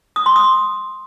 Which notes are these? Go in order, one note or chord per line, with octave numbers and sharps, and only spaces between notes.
D#6
C6
D#6